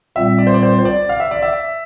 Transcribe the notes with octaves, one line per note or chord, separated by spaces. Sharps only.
A#2 G3 C4 E5
D5
C5
D5
C5
C5
D5
F5
E5
D5
E5